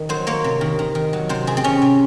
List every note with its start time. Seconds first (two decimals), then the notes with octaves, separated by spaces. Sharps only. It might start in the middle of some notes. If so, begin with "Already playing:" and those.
Already playing: D#3
0.09 F#3 C5
0.27 A#3 C#5
0.44 C3
0.61 D#3
0.79 D#3
0.95 D#3
1.13 F#3
1.29 C3 C5
1.47 C3 G#4
1.57 C4
1.64 C3 C#4
1.82 C3